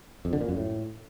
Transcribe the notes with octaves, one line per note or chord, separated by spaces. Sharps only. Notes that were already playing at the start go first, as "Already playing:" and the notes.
F2
D3
A#2
F#2
A2